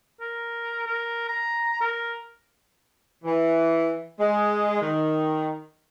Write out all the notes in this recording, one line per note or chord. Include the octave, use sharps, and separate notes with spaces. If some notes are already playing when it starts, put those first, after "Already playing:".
A#4
A#4
A#5
A#4
E3
G#3
D#3